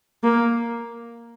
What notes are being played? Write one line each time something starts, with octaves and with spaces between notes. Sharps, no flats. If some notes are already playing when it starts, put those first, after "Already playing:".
A#3